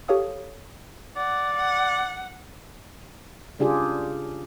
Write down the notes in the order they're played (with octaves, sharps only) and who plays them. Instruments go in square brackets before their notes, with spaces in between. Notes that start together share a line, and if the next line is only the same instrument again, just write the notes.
[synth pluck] G4 A4 C#5 F5 D#6
[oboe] D5 [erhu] F#5
[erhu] F#5
[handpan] C#3 D4 F4 G4 G#4